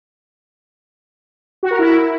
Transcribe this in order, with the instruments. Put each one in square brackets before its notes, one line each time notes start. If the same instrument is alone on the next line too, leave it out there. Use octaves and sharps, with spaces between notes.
[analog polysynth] F#4
A#4
E4